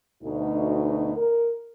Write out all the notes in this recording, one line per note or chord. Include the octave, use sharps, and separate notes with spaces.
D2 B2 D#4
A#4